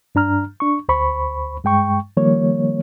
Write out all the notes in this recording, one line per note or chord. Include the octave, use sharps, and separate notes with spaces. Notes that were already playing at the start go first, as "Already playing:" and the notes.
G2 D4 A#5 F6
D4 C#6
D2 C5 B5 C#6
G2 G#3 G5 C#6
D#3 F3 G3 A#3 C#5